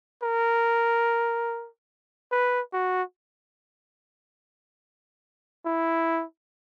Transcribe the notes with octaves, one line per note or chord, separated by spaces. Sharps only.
A#4
B4
F#4
E4